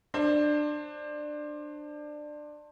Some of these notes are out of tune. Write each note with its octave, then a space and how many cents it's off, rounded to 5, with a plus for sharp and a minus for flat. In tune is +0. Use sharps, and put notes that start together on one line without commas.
D4 +20 C5 +20